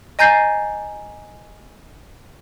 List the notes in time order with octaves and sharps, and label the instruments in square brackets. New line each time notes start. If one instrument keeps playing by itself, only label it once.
[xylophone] D#5 G#5 A#5 G6 A6 C7